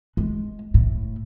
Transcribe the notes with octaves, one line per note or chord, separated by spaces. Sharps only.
G#3
A2